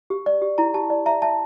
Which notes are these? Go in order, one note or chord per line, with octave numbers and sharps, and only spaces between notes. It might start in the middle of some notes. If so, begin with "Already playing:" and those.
G4
D5
G4
E4 A#5
G4 A5
D5
E5 A#5
E5 A5